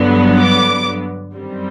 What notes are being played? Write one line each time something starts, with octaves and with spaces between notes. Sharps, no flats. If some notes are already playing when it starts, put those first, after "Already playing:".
Already playing: G2 D3 F#3 B3
D6
F#2 D#3 G3 C4